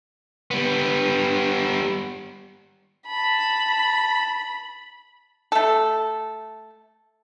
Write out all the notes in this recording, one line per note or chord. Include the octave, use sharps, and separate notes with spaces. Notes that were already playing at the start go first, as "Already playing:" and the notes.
G3 B3
A5 B5
A3 A4